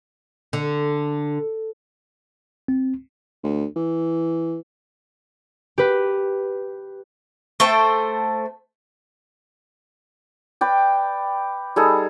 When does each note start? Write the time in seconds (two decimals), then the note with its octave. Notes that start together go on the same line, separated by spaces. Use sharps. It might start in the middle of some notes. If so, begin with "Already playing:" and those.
0.53 D3
2.68 C4
3.43 D2
3.76 E3
5.78 G4 B4
7.60 A3 A4 C5 G5
10.61 B4 D5 G5
11.76 G3 D#4 G#4 A4